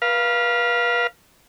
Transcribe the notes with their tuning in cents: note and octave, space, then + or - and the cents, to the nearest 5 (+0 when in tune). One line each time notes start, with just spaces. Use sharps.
B4 -35 F5 +0